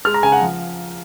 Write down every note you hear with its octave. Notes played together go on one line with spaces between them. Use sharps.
G#3 F6
A#5
C#3 G#5
F#5
F3